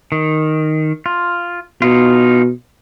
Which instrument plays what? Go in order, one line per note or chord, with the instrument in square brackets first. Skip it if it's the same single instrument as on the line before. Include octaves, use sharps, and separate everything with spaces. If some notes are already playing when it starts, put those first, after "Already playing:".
[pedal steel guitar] D#3
F4
[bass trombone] B2 [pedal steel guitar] D#4 F4